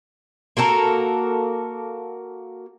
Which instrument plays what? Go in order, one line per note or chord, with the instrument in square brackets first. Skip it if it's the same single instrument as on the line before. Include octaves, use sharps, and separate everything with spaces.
[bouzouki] A#3 F#4 A4 A#4